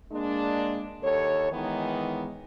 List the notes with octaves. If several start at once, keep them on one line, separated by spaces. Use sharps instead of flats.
G#3 A#3 D4
D#2 A4 C#5
D#3 E3 G#3 B3 D#4